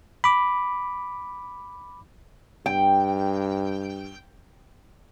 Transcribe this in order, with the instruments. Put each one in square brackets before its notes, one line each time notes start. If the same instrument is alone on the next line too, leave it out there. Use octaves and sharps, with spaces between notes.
[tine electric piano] B5 D6
[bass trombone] G2 [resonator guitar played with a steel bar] G5